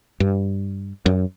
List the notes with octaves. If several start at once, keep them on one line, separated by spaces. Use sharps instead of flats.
G2
F#2